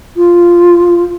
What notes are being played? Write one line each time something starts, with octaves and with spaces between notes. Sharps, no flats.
F4